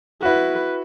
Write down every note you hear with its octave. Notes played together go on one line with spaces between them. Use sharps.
E4 F#4 B4